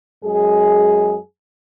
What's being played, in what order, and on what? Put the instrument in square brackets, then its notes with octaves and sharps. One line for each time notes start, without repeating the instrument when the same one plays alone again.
[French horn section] F#2 G#3 G#4